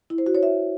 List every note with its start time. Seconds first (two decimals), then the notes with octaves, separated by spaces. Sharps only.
0.10 E4
0.18 C5
0.26 F#4
0.35 C#5
0.43 E5